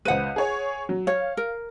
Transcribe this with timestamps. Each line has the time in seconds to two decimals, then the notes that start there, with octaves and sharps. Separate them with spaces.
0.05 C#2 B4 C5 F#5 D#7
0.36 G#4 C#5
0.89 F#3
1.07 C#5 F5
1.37 A#4